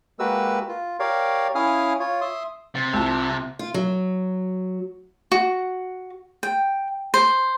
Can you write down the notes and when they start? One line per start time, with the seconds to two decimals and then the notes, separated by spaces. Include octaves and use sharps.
0.19 G#3 A#3 F#4 G4 B4 E6
0.68 F4
1.00 G4 A#4 C#5 D5 F5
1.55 C#4 E4 F5 G#5 D#6 F6
2.00 F4 C#5
2.21 E5 C6 D#6
2.75 C3 A6
2.93 C2 F4 A5 E6
3.59 F4
3.74 F#3
5.32 F#4
6.43 G5
7.14 C5